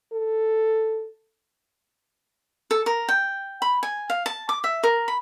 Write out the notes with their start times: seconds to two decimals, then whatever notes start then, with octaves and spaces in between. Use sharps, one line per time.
0.13 A4
2.71 A4
2.86 A#4
3.09 G5
3.62 B5
3.83 G#5
4.10 F5
4.26 A5
4.49 D6
4.64 E5
4.83 A#4
5.08 B5